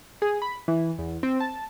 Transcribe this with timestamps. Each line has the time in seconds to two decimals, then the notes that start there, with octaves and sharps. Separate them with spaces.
0.22 G#4
0.42 B5
0.68 E3
0.98 E2
1.23 C4
1.40 A5